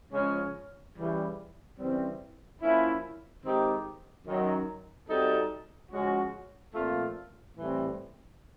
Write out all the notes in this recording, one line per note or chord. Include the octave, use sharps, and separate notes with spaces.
C#3 F3 G#3 C#4
C#3 E3 G3
C#3 E3 G3 C4
F3 A#3 C#4 E4
D#3 G#3 C4 D#4 G4
F#2 D#3 F#3
G3 C4 D#4 F#4 A4
C#3 F3 G#3 C#4 F#4
A#2 F3 A3 C4 F4
A2 E3 G3 C4